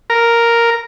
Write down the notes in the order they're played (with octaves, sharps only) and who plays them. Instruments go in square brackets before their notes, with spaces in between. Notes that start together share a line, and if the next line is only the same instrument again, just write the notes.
[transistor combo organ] A#4